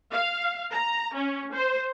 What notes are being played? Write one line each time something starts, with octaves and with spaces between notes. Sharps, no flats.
F5
A#5
C#4
C5